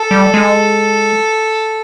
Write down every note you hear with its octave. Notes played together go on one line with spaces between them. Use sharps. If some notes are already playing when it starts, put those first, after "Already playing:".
Already playing: A4
G3
G#3